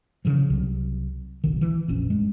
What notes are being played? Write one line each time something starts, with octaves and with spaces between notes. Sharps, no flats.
C#3 E3 F3
C2 C3 F#3
D1 A#1 B2 D#3
E3
F1 A#1 C#4
G2 G#3